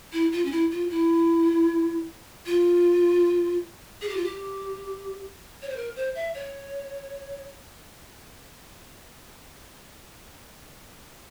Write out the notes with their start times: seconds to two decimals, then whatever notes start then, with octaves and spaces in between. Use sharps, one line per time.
0.13 E4
0.32 F4
0.45 C#4
0.51 E4
0.71 F4
0.90 E4
2.46 F4
4.02 G#4
4.09 G4
4.17 F4
4.24 G4
5.62 C#5
5.69 C5
5.76 A#4
5.96 C5
6.15 E5
6.35 C#5